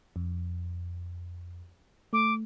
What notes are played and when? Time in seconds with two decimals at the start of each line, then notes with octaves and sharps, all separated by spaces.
0.16 F2
2.13 A3 D6